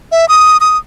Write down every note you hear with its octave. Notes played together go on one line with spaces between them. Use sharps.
E5
D#6
D#6